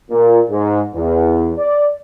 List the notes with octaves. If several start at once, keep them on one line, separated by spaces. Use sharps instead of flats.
A#2
G#2
E2
D5